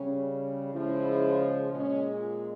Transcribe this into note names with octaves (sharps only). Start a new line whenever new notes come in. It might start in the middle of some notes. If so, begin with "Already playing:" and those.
Already playing: C#3 G3 C#4
C#3 F3 G#3 E4
A#2 G#3 C#4
F4